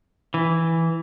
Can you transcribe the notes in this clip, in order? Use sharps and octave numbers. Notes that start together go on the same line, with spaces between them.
E3